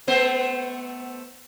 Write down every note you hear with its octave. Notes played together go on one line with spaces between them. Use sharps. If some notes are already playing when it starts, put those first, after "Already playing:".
A3 B3 C5